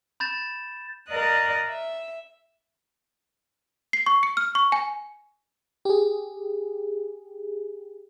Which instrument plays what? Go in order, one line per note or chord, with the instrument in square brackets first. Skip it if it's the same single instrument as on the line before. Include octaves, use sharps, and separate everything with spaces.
[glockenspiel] B5 G6 A6 E7
[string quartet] A#4 D5 D#5 F5 D#6 F#6
E5
[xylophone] C7
C#6
C#7
F6
C#6
G#5
[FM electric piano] G4 G#4